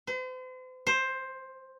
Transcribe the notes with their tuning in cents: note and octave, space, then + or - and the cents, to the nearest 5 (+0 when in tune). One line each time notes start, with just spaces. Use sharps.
C5 -40
C5 +10